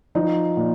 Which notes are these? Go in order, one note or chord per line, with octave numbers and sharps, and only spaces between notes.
F3 D#4
A#2